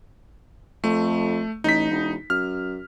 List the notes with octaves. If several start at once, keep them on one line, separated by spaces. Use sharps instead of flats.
F2 A3
A1 D#4 B6
E1
F#2 F6